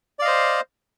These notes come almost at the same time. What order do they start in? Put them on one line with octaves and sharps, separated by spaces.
D5 F5 D#5 C5